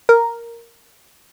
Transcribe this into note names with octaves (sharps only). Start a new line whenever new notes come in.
A#4